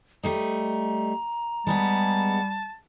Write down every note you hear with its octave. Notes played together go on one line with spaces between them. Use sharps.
G3 A3 D#5 A#5
G3 G#3 B3 G#4 A5